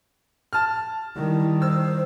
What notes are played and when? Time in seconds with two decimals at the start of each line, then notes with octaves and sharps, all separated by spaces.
0.53 A5 F6
1.16 D#3 G3 E4
1.62 C5 E6